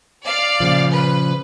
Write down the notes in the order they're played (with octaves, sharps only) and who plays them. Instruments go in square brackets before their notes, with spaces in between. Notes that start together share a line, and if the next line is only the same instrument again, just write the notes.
[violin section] D5 F5
[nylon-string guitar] A#2 C#3 F3
[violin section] B4